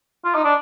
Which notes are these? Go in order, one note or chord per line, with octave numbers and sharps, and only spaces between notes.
F4
D#4
D4